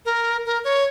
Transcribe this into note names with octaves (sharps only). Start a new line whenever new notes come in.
A#4
A#4
C#5